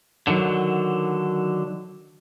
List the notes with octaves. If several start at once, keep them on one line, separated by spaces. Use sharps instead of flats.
D3 D#3 F3 F#3